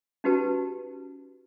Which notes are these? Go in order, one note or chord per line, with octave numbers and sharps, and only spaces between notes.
C#4 D#4 F#4 G4 B4 A5